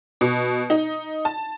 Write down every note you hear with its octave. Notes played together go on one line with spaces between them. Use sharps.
B2
D#4
A5